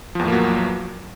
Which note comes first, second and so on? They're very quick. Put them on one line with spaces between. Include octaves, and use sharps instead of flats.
F3 E2 A2 A#3 F#3